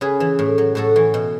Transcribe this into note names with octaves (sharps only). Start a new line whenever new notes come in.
C#3 G#4 B4
E3
A2
F#3
A2 F#4 A4
E3
B2